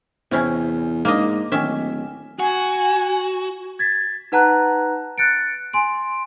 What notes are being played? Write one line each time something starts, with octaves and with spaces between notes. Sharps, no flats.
E2 C3 C#4 E4
G#2 A#3 D4 D#5
D1 D#3 C#4 E5
F#4 G#5
G#6 A6 B6
D#4 B4 F#5 A5 A#5 F#6
F#6 A6 C#7 D7
G#5 C6 D7